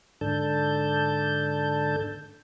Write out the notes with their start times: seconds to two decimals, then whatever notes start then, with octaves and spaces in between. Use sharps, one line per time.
0.21 G#2 D3 D4 A4 A5 G6